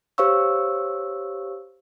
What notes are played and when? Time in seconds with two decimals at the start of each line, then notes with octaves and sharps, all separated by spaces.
0.18 G4 C5 C#5 F5 C#6 E6